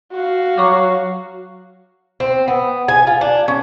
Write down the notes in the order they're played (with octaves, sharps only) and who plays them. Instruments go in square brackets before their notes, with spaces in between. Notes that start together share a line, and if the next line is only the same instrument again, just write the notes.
[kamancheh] F#4 F5
[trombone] F#3 [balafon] C#6 D6
[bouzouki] C4
B3
G#5
F4
D4
C#4